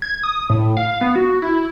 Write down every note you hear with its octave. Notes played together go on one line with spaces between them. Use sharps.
G#6
D#6
A2
F5
B3
F#4
E4